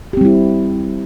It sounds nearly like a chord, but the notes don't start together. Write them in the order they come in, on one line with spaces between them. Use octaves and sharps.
G4 C4 G3 E4